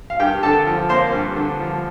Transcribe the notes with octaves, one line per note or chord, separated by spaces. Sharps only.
F5
G2 G4 G5
D3 A4 A5
F3
A#3 C5 C6
G2
D3
F3